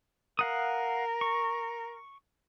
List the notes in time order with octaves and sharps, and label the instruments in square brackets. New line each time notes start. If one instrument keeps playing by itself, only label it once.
[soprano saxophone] A#4 [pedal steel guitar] F5 F#5 D#6
[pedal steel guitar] C#6